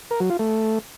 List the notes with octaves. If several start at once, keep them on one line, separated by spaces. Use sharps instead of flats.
A#4
F#3
F4
A3